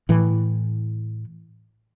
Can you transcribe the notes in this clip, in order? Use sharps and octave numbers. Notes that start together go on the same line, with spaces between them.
A2 E3